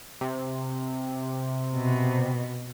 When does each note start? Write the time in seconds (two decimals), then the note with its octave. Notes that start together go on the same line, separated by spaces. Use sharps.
0.21 C3
1.77 B2